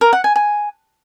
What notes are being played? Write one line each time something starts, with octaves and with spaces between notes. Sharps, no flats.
A#4
F#5
G#5
G#5